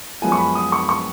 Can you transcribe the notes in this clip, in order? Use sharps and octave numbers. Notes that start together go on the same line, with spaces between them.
F#2 F3 G#3 B3 F4 G#5
C#6
B5
D#6
C#6
C#6